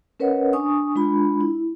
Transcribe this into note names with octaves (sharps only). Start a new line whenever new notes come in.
C#4 A#4 B4 C#5 D#5 F#5
D4 G#5 C#6 D#6
G#3 D4 F4 B5
E4